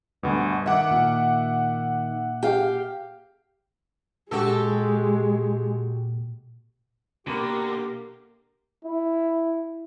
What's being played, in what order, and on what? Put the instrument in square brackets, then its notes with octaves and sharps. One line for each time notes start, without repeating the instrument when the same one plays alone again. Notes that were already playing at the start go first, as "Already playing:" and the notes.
[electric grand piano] D2 B2 [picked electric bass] G2
[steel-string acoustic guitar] D#3 [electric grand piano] E5 F#5 D6
[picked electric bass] A#2
[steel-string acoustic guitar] G4 F5
[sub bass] A#2 [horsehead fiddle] G#3 [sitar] F#4 G4 A4
[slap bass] B2 [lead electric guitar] D3 [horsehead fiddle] A#3 A#4 [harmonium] G4
[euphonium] E4